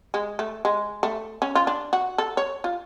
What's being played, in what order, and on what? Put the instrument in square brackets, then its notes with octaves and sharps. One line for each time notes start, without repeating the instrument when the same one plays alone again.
[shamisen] G#3
A3
G#3
A3
C#4
F4
D4
F#4
A4
C#5
F4